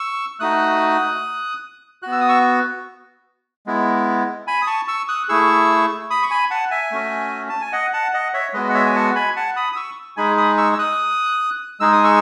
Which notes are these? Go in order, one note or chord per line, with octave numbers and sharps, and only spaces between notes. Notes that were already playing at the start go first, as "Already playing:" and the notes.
Already playing: C#6 E6
A3 D#4 F#4 D#6 F#6
B3 F#4 F#6
E6
D#6
C#6 E6
G#3 B3 E4
G#5 B5
D#6
A5 C#6
C#6 E6
D#6 F#6
A3 E4 G#4 C#6 E6
B5 D#6
C#6
G#5 B5
F#5 A5
E5 G#5
A3 C#4 F#4
A5
G#5
D#5 F#5
F#5 A5
D#5 F#5
C#5 E5
G#3 B3 F#4 B4 D#5
F#5
C#5 E5
G#5
F#5 A5
G#5 B5
F#5 A5
B5 D#6
D#6
C#6 E6
G#3 D#4 G#4 G#5 B5
B5 D#6
C#6 E6
E6
D#6 F#6
G#3 D#4 G#4 E6
D#6
C#6 E6